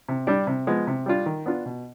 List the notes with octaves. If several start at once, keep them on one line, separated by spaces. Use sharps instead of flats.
C3
G3 D4 G4
C3
F3 G#3 B3
C3
G3 D4 F4
D#3
B3 D4 F4
B2